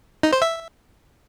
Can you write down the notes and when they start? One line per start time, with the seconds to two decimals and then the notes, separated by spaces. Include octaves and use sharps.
0.23 D#4
0.33 C5
0.42 E5